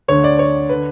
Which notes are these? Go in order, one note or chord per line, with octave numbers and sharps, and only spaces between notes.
D2 D3 C#5
D5
C#5
D3 B4